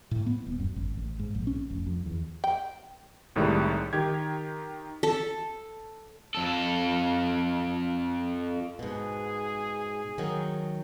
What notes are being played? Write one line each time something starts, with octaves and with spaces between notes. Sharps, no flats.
A2
B3
D#1
F#2
G#1
A1
G#2
A#1
C#4
F1
F2
E2
G5
C2 A2 D#3 G3 G#3
D#3 G4 G#6
A4
F2 A4
G#2 B2 G#4
D#3 F#3